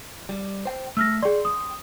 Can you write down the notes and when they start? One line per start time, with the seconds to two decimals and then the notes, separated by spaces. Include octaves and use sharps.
0.29 G3
0.65 C5 G5
0.97 A3 E6 F6 A#6
1.23 G#4 D5 G5 C6
1.45 D#6